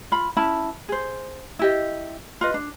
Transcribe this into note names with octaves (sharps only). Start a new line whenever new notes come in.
F4 B5
C#4 E4 A5 B5
G#4 C5
E4 G4 D#5
F4 B4 D#5
D4